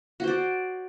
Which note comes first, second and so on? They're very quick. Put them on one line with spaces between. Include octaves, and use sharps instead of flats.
F#4 C5 D5